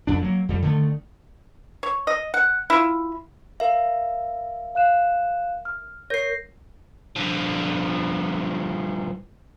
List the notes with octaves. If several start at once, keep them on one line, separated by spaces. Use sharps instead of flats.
F2 D4
F#3 A#3
F2 G3
D3 D#3 A3
C#5
D#5
F#5
E4 F4
A#4 E5 F5
F5 F#6 E7
F6
A#4 C#5 G6 A#6 C7
G2 F3